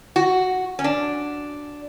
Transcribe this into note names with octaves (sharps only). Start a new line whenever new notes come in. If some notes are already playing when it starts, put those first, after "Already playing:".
F#4
C#4
D4